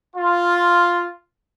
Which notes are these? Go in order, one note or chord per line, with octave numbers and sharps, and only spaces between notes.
F4